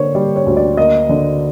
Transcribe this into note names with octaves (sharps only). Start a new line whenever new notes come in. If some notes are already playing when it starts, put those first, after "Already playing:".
Already playing: D3 A#3 C5 C#5
G3 D5
C#5
D2
D5
A#3 D#5
D3